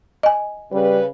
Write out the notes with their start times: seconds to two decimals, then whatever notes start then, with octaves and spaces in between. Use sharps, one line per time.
0.23 D#5 G#5
0.72 C#3 G3 B4